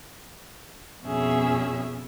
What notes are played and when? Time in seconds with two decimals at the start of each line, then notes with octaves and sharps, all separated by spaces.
1.04 F2 B2 C#4 G#4 E5